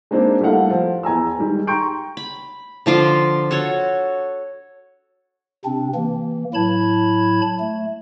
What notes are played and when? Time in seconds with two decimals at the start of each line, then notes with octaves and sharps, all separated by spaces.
0.11 G#3 A#3 C4 D4 D#4
0.41 G3 A3 A#3 E4 F5 F#5
0.70 F3
1.03 E2 G#5 A#5 E6
1.39 D#3 G3 G#3
1.67 G5 A#5 C6 C#6 G6 D7
2.17 B5
2.86 D3 F3 F4 D6
3.51 F#4 A4 C#5
5.65 C3 C4 D4
5.94 E3 A#3
6.54 A2 F#3 E4 A5 B5 G#6
7.59 A3